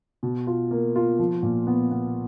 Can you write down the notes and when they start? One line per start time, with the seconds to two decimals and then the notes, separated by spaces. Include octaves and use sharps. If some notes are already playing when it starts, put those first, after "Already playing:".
0.23 B2
0.47 F4
0.71 A#3
0.96 F4
1.19 F3
1.43 A#2
1.67 B3
1.91 B3